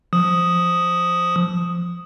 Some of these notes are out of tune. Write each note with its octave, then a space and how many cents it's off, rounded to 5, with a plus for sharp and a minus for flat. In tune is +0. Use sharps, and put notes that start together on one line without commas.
F3 +0 D#6 +0